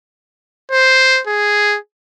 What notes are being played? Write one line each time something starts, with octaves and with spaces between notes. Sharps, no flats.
C5
G#4